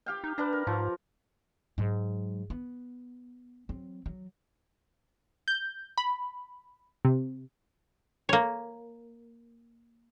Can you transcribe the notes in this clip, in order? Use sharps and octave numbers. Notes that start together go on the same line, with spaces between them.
G4 F5 G5
D#4
D4 B4 D5 A#5
A#4
G#2 F3
G#2 F#3
B3
F#3 C4
F#3
G6
B5
C3
A#3 C#5